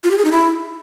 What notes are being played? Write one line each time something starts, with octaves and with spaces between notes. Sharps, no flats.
F4
G4
G#4
D#4
E4